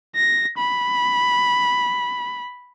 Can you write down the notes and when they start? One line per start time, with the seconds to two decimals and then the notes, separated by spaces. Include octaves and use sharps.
0.15 A#6
0.58 B5